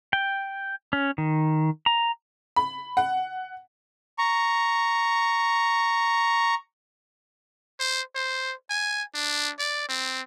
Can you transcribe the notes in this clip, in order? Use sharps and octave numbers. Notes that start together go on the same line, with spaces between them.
G5
C#4
D#3
A#5
B5
F#5
A#5 C#6
C5
C5
G#5
D4
D5
C4